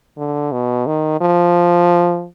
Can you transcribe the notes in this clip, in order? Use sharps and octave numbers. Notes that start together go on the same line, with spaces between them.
D3
B2
D#3
F3